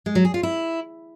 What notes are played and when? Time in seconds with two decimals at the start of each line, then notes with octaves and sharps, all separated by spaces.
0.06 G#3
0.15 F#3
0.25 G#4
0.34 F4
0.43 E4